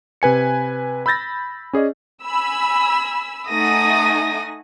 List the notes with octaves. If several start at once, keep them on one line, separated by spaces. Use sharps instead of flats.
C3 B4 G#5 C#7
B5 E6 G6 A6 A#6
C#4 G#4 D5 D#5
G#5 B5 E6
A3 D#4 F#5 G#5 D#6 A#6